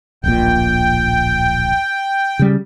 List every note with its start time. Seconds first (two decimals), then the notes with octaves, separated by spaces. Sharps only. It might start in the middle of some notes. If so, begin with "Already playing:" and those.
0.24 D1 A#1 A#2 G5
2.39 C#3 G3